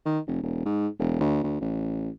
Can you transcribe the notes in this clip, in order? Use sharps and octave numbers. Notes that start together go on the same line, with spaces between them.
D#3
F1
E1
G#2
E1
D2
D2
A1